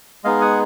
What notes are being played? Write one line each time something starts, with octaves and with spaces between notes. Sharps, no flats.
G#3 B3 D#4 G#4 D#5 F5
F#5 G#5